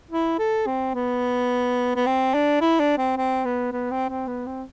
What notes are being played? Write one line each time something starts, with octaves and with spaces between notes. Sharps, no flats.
E4
A4
C4
B3
B3
C4
D4
E4
D4
C4
C4
B3
B3
C4
C4
B3
C4